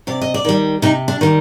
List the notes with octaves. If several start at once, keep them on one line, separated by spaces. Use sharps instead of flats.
C3 D5
D#5
D5
D#3 G3
C3 D#4
D4
D#3 G3